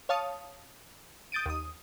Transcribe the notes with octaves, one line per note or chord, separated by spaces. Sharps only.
C#5 F5 A5 D#6
D#6 G6 A6 D7 D#7
D#2 D#6